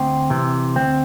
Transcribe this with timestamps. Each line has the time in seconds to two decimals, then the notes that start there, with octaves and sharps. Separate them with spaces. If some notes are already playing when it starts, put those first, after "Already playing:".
Already playing: D2 C4
0.30 C3 E3
0.76 D2 C4